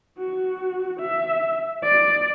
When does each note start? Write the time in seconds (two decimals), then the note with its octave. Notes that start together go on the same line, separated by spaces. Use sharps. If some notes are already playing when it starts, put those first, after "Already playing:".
0.18 F#4
0.99 E5
1.82 D5